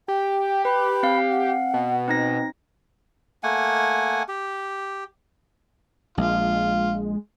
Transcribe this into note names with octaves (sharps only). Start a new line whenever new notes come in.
G4 G5
B4 B5
C4 F5
F#5
B2
C4 D#4 A#6
A3 A#3 F#5 G#5
G4
A#1 G#3 F4